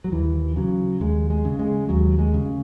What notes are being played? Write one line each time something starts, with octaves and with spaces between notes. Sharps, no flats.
F#3
D#2 E3
C#3 F#3
D#2 G#3
G#3
C#3
G#3
D#2 F#3
G#3
C#3